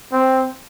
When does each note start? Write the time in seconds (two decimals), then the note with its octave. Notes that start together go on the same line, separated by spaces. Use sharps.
0.13 C4